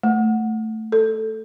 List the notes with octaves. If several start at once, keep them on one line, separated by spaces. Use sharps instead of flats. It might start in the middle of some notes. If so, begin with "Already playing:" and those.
A3
A4